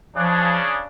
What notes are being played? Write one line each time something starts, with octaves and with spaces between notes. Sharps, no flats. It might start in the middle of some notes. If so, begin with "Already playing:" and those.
C#3 F3 D4